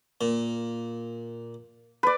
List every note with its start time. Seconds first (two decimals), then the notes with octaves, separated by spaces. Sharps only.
0.21 A#2
2.03 B4 D5